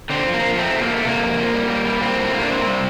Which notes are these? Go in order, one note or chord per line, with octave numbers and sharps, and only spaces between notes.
D3 C4
F3
A#3
F3
A3 C4
C3
A#3
A3
C3 A#3
F2
F3
G3
A#3
G3
A#3 C4
A2
A#3
D4
C3 C4
G3